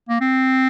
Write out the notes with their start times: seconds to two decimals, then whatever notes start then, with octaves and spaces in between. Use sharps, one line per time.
0.09 A#3
0.21 C4